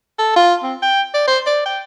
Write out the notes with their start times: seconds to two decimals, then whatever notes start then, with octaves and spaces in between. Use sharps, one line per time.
0.19 A4
0.36 F4
0.63 C4
0.82 G5
1.14 D5
1.27 C5
1.46 D5
1.66 G5